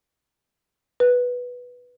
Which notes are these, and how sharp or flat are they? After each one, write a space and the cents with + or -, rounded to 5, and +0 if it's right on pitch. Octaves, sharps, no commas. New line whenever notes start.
B4 -5